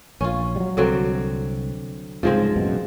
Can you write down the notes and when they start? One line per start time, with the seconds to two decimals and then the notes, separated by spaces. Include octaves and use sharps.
0.21 A#1 C#4 F4
0.56 F#3 G3
0.77 C2 D3 F#3 C4
2.23 C2 G#2 C#3 F3 G#3 C4
2.56 A1 F#2 B2